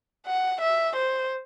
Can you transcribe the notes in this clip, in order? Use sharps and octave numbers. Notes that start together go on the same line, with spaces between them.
F#5
E5
C5